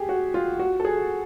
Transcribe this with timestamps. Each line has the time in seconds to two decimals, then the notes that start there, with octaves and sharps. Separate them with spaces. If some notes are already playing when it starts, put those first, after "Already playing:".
Already playing: G4 G#4
0.09 F#4
0.34 F4
0.59 F#4
0.80 A4
0.85 G#4